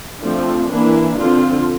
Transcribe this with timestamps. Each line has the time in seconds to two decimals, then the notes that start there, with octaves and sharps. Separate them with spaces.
0.23 F3 A3 C4 D4
0.69 E3 A#3 D4 E4
1.16 D3 F3 C4 F4